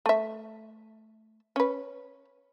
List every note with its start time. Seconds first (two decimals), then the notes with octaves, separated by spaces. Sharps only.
0.06 A3 E5
1.56 C#4 B4